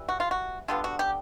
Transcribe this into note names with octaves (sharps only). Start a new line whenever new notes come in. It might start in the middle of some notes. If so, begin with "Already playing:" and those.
Already playing: E3 G3
F#4
F4
F#4
D3 G3 B3 F4
F#4
G4